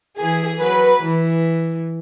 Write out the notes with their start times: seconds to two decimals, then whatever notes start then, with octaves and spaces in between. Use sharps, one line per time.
0.19 E3 G#4
0.60 F#3 B4
1.02 E3